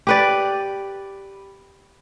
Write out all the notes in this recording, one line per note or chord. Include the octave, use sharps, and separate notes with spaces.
G4 B4 D5